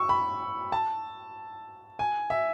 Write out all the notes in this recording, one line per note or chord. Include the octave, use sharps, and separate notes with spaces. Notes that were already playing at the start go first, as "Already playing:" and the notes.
Already playing: C#6 E6
B5
A5
G#5
E5